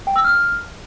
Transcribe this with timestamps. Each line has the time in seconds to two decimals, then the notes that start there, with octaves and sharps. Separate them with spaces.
0.07 G5
0.16 E6
0.24 F6